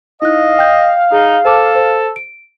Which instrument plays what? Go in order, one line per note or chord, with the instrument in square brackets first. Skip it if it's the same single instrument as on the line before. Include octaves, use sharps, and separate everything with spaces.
[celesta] D#4 E4 F#6 [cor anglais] D#5 [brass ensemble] F5
[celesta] G5 G6
[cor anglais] D#4 [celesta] G#4
[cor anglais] A4 [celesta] C5 A5 D6
[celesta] C5
D7